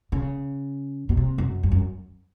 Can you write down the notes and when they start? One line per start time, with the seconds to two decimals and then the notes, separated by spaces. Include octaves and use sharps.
0.12 C#3
1.09 B2
1.17 C3
1.38 F#2
1.63 G2
1.72 F#2